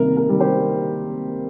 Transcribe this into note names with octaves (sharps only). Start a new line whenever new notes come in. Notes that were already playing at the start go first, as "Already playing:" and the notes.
Already playing: C3 D#3 G3 A#3 A#4
A#4
D#3 G3 A#3
G4 C5